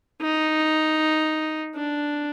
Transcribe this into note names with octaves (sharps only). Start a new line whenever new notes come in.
D#4
D4